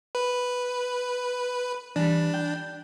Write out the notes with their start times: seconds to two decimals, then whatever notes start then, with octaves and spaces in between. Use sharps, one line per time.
0.15 B4
1.96 E3 G3 D4
2.34 G5